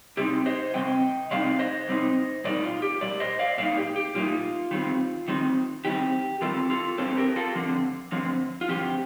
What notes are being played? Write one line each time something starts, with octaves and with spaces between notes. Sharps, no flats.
C3 G3 C4 D#4 G4
C5 D#5
C3 G3 C4 D#5 G5
C3 G3 C4 D#4 D5 F5
C5 D#5
C3 G3 C4 D#4
A#2 G3 D#4 D5
F4
G4
A#2 G3 D5
C5 D#5
D5 F5
A#2 G3 A#3 D#4 D5 F5
G4
G4
A#2 G3 A#3 D#4 F4
D#3 G3 C4
D#3 G3 C4
D#3 G3 C4 G4
D#3 G3 C4 F4 A4
F4 A4
G2 D3 F3 C4 A4 C5
G4 A#4
F4 A4
G2 D3 F3 C4
G2 D3 F3 C4
F4
G2 D3 F3 C4 G4